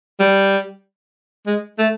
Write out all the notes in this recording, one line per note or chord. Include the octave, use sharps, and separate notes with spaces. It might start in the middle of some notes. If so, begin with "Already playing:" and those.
G3
G#3
A3